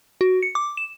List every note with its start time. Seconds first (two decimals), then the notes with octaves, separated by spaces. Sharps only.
0.21 F#4
0.43 C#7
0.55 D6
0.77 E7